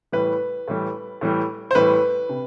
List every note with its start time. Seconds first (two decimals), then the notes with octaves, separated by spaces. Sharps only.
0.12 A2 E3 G3 B4
0.68 A2 E3 G3
1.21 A2 E3 G3
1.71 C5
1.75 A2 E3 G3 B4
2.29 C3